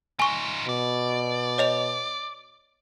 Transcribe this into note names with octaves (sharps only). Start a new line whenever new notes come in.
D#4 F4 G#5 C#6
B2 D5
C#5 D#5 F7